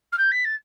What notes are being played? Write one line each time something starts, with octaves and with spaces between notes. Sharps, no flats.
F6
G6
B6
A6